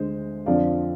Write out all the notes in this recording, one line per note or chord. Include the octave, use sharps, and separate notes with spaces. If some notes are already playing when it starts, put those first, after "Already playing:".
Already playing: D2 D3 G#3 C5
F2 D3 F3 D5 F5